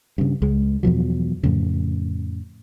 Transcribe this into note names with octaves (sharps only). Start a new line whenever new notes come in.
G2 C#3
C#2 G#3
E2 B2 F3 F#3
F2 A2 C#3